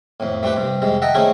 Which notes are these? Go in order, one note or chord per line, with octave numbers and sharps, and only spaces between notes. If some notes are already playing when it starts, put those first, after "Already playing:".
F2 A2
A3 C4 D4 G4 B4
G2 C3
F2 C3 G#3
D#5 E5 F#5 G5 A5 A#5
A3 C4 C#4 D#4 E4 G#4